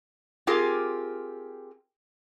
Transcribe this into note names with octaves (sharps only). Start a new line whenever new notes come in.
C4 F4 G4 G#4 A#4